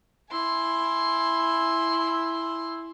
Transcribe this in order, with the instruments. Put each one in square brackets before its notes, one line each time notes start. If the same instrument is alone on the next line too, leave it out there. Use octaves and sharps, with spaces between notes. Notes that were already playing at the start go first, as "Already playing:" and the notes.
[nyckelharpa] E4 [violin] G#5 C6